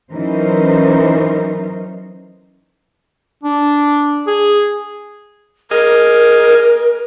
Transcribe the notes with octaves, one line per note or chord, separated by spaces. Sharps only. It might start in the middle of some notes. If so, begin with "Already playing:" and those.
E3 F#3 C#4 D#4 A#4 C5
D4
G#4
G#4 A#4 D#5 F6